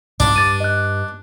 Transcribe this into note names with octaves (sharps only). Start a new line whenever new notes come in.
C2 G#2 B2 D4
G2 D6 A6 D#7
D#5 F#6